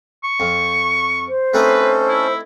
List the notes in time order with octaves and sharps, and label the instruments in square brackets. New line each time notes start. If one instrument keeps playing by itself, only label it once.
[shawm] C#6
[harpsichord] F2
[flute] C5
[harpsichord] A3 C4 D#4 [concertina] C#4 A4 [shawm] B4
[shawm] E4